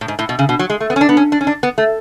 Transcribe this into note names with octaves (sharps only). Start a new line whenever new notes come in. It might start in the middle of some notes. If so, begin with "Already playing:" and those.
A2
G#2
A2
B2
C#3
B2
F#3
G#3
A3
B3
C#4
D4
B3
C#4
D4
C#4
D4
B3
A3